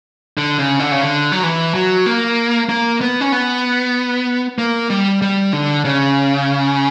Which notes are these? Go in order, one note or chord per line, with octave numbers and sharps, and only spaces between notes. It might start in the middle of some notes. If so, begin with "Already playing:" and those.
D3
C#3
D3
C#3
D3
F#3
E3
F#3
A#3
A#3
B3
C#4
B3
A#3
G3
G3
D3
C#3